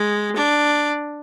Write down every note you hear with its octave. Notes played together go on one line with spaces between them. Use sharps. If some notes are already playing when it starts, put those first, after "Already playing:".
Already playing: G#3
D4